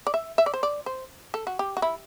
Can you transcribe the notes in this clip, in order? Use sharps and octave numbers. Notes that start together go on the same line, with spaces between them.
D5
E5
E5
D5
C5
D5
C5
A4
F#4
G4
F#4
E4